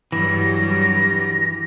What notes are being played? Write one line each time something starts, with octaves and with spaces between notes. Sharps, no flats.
G2 E3 F#3 G3 A#6